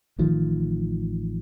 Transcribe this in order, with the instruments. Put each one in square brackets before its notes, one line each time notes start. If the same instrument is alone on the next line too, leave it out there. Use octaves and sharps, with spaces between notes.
[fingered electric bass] A1 D#3 F3